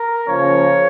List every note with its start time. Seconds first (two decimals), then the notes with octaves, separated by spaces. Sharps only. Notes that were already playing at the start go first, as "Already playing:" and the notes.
Already playing: A#4
0.27 C#3 F3 A#3 C#4 C#5